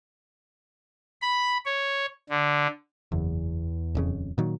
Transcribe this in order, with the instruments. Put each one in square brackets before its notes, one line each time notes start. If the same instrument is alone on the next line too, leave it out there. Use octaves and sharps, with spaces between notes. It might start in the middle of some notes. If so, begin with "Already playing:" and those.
[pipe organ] B5
C#5
D3
[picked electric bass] F#1 [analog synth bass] E2
[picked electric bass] D#1 F2 C#3
A#2 D#3 F#3